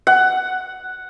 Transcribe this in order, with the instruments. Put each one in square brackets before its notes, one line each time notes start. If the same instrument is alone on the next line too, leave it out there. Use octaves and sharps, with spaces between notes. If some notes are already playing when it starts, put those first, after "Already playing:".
[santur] F#5